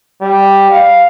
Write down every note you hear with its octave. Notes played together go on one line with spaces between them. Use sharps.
G3
F5